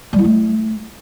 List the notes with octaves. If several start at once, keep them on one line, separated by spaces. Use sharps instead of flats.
G3
E4
A3